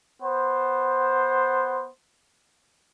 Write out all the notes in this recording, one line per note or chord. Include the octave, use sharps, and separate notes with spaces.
B3 C5